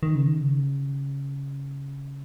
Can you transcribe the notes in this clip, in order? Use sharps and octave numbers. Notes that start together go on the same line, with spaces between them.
D#3
C#3
D#3
C#3